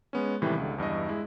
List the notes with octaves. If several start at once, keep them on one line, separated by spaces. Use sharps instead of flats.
G#3 B3 C#4
A2 C3 D#3 E3 G3
C#2 D3
E2 G2 E4 D#5
G#3 E4